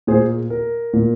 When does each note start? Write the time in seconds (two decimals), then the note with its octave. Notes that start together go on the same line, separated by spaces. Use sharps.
0.07 A#2 A#3 G#4 C5
0.50 A#4
0.93 A#2 A#3